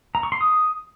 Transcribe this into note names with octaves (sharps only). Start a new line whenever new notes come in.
A#5
C#6
C6
D#6